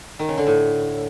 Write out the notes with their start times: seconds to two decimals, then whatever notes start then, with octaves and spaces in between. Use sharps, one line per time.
0.19 D#3
0.28 C#3
0.38 D3
0.47 A2